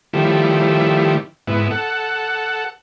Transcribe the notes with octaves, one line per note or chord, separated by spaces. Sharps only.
D#3 F3 G3 A3 E4
G#2 B3 E4
A4 F#5